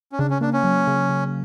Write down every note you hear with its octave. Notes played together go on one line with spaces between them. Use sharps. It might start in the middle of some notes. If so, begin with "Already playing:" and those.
C#4
C#3 D4
C#4
A#3 D4
C#4
F#3
C#3
C#3